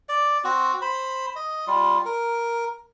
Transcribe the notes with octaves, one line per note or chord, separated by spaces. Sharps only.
D5
C4 F#4
C5 B5
D#5
G3 F4
A#4